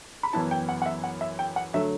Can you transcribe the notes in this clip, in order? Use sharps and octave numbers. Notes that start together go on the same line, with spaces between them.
B5
F#2 E3 B3 E4 A5
G5
F#5
F#5
E5
F#5
E5
G5
F#5
D3 F#3 A3 E5